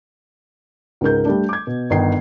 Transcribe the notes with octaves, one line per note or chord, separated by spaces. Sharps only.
C#2 G#2 A#4 G6
G3 A3 D4
D6 G#6
B2
G1 D#3 D#4 G5 C7